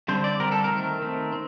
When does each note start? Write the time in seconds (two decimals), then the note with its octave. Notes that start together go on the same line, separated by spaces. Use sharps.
0.08 D3 G3 C4 C5
0.24 D5
0.39 D3 G3 C4 A#4
0.52 A4
0.64 A#4
0.71 D#3 A3 C4
1.02 D#3 A3 C4
1.32 C4